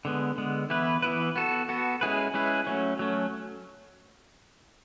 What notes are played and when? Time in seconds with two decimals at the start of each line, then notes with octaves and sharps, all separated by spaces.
0.05 D3 G#3 B3
0.38 D3 G#3 B3
0.70 E3 B3 E4 B4
1.02 E3 B3 E4 B4
1.36 B3 F#4 A4
1.69 B3 F#4 A4
2.01 G#3 C#4 E4 G#4 B4
2.34 G#3 C#4 E4 G#4 B4
2.67 F#3 A3 C#4
2.99 F#3 A3 C#4